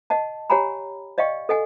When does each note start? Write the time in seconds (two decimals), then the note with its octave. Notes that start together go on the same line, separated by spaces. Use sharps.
0.10 D#5 F#5 A5
0.50 G4 C#5 F#5 G#5 A#5 B5
1.18 D5 D#5 F5 G5 C#6
1.49 A4 D#5 F#5 G#5